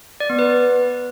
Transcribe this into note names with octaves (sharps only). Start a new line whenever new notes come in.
D5
B3
B4